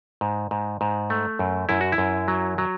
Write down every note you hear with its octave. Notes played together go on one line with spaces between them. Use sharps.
G#2
G#2
G#2
A3
F#2
F#2 E4
F#4
E4
F#2
F#3
F#3